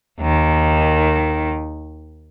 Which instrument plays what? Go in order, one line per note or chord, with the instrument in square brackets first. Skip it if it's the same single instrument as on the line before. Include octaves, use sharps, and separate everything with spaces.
[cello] D#2 D#3